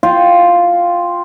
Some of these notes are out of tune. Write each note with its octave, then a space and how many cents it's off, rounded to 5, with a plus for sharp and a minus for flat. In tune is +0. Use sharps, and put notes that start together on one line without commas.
F4 +0 G5 +0